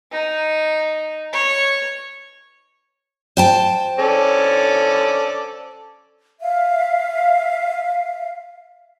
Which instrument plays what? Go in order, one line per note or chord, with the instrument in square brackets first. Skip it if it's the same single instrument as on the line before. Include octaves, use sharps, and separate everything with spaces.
[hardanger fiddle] D#4
C#5
[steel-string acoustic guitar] C5 G5 A5
[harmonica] C#4 A4 D5
[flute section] E5 F5